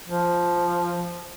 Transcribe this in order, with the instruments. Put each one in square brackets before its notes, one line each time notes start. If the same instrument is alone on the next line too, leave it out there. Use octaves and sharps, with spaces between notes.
[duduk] F3